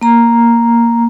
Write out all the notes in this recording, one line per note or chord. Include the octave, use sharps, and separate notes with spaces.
A#3 A#5